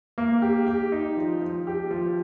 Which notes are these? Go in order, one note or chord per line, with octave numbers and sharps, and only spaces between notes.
A#3
G4
G4
D#4
F3
F3
G4
F3